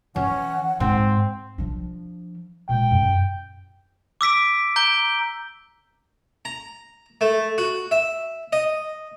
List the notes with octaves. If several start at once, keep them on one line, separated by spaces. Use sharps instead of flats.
E3 C#4 F#5
G#2 C4
F3 D4
A#2 G#3 G5
F#2
D6 E6 B6 D7
A#5 G6 D7 G7
A#5
A3
F#4
E5
D#5